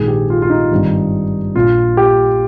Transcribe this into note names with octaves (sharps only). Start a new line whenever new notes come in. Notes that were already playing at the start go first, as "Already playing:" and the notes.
Already playing: A#1 G#2 D#3 G#4
G4
F4
F4
D#4
G#1 G2 D#3
A#1 A#2 F4
G4